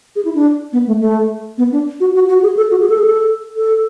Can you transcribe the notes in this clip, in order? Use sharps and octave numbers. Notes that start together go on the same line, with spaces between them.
G#4
E4
D4
B3
A3
A3
B3
D4
F#4
F#4
F#4
G#4
A4
F#4
G#4
A4
G#4
A4
A4